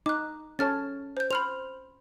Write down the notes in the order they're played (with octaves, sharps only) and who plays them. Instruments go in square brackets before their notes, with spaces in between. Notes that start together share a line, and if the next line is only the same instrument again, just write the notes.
[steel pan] D#4 [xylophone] D6 F#6
[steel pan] C#4 A4 C#5 [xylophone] A5 F6 A6
[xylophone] C5 G6
[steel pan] C5 [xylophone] B5 F6 F7